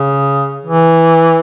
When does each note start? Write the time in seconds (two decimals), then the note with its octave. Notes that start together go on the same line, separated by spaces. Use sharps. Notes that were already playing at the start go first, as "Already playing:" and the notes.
Already playing: C#3
0.65 E3